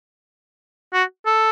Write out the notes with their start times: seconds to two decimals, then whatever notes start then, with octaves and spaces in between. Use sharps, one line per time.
0.94 F#4
1.26 A4